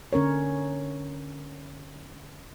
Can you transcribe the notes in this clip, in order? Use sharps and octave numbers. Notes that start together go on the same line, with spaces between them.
D3 C#4 A#4 C#5